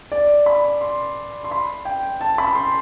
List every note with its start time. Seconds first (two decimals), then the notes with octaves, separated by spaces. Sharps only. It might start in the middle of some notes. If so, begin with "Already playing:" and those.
0.12 D5
0.46 B5
0.81 C6
1.44 C6
1.51 B5
1.85 G5
2.21 A5
2.38 B5
2.55 C6